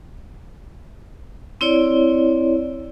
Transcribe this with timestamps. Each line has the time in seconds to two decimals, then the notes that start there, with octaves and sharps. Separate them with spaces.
1.61 C4 E4 C#5 D5